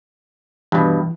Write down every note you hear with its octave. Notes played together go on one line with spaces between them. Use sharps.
G2 B2 E3